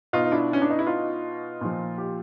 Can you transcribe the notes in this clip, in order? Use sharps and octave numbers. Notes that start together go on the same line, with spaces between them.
B2 D#4 F4
D#4
D4 E4
C#4
D4
D#4
E4
D#4 F4
A#2 F3
F4 G4